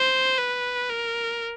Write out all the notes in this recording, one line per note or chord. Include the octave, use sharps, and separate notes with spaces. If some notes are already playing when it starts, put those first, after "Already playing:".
Already playing: C5
B4
A#4